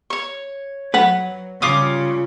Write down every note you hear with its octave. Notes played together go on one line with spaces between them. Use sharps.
C#5 C#6
F#3 B4 F#5
C#3 G3 F4 D6 D#6